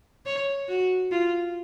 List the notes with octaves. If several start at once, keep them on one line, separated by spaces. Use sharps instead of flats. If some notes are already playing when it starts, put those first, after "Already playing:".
C#5
F#4
F4